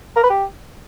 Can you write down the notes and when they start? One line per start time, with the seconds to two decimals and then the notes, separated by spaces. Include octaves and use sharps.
0.16 A#4
0.23 B4
0.30 G4